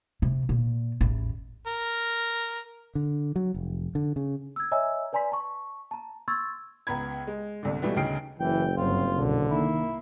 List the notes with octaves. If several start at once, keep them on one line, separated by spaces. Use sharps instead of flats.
C3
A#2
A1 E2
A#4
D3
F#3
F1
D3
C#3
E6 G#6
C#5 D#5 E5 G#5 A#5 E6
B4 D5 G#5 A#5 C6 B6
A5 C#6
A5 A#5
C6 C#6 E6 G#6 A6
C#2 B3 A#5 B5 G#6
G#3
G1 C2 D3
B2 E3 G3 A3 B3
D2 C#3 D#4 G5 C7 D7
F#1 E3 G5
G1 F#3 C4 F4
C2 B2 D3
D#3 A#3 E4